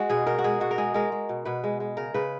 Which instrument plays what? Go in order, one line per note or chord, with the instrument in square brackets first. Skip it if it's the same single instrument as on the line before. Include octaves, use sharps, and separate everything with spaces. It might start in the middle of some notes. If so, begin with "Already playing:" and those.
Already playing: [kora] G#3 F#4
B2 G#4
B2 A#4
F#4
G#3 G#4
B2 F#4
A#4
G#3 G#4
G#3 A#4
G#3
B2
B2 B4
G#3
G#3
C#3 A#4
C#3 B4